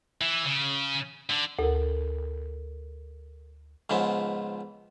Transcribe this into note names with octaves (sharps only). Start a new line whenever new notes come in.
E3
C#3
D3
D2 A4 A#4
C#2 G#2 F3 B3